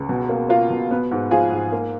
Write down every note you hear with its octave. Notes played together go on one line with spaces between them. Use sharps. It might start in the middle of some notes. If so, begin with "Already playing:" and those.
Already playing: C#2
B2
A#3
A#3 F4
B2
B3
G#2
F3 F4 G#4
G#2
A#3